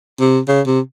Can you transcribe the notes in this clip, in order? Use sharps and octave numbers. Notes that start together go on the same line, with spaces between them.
C3
C#3
C3